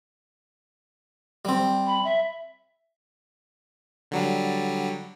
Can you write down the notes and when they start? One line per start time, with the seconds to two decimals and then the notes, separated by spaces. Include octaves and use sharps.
1.45 G3 C4
1.87 B5
2.05 E5
4.11 D3 F#3 G3